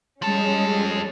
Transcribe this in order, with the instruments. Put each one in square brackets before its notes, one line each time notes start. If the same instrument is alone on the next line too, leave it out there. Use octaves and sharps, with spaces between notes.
[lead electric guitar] F3 A4 [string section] G3 G#3 C#4